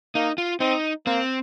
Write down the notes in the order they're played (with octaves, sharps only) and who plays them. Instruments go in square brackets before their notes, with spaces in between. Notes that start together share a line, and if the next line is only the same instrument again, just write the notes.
[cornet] A#3 [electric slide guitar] D#4
[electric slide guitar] F4
[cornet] C4 [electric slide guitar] D#4
[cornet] A#3 [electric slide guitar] C4